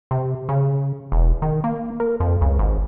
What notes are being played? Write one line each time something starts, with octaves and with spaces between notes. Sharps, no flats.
C3
C#3
E1
D#3
A#3
A#4
F2
C#2
G#1